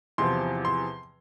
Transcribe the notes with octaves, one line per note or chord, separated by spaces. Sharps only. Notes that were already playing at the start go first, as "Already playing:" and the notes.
E2 C3 F3 C6
C6